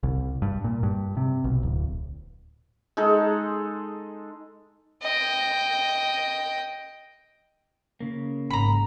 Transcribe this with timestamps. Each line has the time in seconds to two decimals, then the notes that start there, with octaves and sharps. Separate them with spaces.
0.03 C2
0.42 G2
0.64 A#2
0.83 G2
1.17 C3
1.44 B1
1.63 D1
2.97 G#3 D#4 A4
5.02 D#5 G5
8.00 C#3 A#3
8.50 G#1 A#5 B5